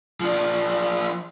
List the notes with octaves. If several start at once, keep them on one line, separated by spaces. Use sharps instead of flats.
F3 D4